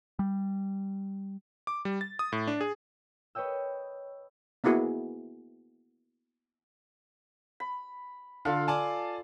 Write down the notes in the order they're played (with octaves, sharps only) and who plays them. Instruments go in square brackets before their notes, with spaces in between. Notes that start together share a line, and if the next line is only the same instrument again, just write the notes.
[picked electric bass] G3
[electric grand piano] D6
G3
A6
D#6
A2
D4
G#4
[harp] B4 C#5 D#5 G5 E6
[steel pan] A#3 B3 E4 F#4 G#4
[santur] B5
[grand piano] D3 [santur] F4 A4 F5
[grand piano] D5 G#5 A5